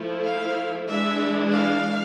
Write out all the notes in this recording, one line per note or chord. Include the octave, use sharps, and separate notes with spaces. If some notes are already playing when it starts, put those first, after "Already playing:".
Already playing: F3 A3 E4
F5
E3 G#3 D4 E5
F5